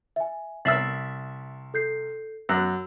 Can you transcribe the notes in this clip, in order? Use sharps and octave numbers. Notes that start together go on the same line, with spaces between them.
E5 G#5
C2 E5 E6 A6 C7 F#7
A4 G6 C7
F#2 E6 F#6